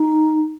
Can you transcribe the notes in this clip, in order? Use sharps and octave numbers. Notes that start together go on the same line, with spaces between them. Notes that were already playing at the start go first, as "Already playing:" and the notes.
Already playing: D#4